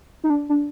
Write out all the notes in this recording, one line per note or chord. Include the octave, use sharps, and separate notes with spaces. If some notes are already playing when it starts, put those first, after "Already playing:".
D#4
D4
D4